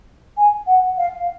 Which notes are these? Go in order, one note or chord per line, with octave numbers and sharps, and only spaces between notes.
G#5
F#5
F5